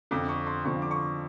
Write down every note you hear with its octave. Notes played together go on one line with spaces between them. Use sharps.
F2 D3 F3 D6
C#6
C6
F2 D3 F3 C#6
D6
C#6